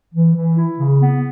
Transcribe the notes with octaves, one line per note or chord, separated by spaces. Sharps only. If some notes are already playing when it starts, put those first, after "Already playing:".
E3
E3
E4
C#3
B3